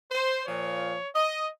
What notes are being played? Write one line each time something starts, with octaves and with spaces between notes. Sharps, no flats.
C5
A#2 F3 C#5
D#5